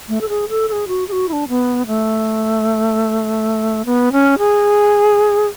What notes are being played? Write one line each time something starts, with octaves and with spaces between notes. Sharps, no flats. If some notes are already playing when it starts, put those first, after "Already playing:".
A3
A4
G#4
A4
A4
G#4
F#4
G#4
F#4
E4
D4
B3
A3
B3
C#4
G#4